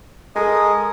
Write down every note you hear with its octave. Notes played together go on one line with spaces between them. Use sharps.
G#3 A4 A#4 D#6